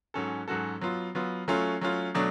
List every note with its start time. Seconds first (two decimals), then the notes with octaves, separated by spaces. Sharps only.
0.14 G#2 F#3 C#4 F#4 A4
0.48 G#2 F#3 C#4 F#4 A4
0.81 F#3 B3 F4
1.15 F#3 B3 F4
1.48 F#3 A3 C#4 F4
1.81 F#3 A3 C#4 F4
2.15 B2 F#3 A3 D4